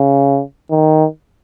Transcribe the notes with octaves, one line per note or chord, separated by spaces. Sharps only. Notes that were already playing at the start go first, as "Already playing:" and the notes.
Already playing: C#3
D#3